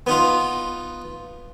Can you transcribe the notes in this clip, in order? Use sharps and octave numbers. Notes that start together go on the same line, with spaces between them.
B3 D#4 F4